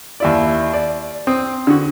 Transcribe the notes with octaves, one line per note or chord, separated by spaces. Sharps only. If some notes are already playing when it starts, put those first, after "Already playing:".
D#2 E4 D5
D5
C4 D#6
D3 F#4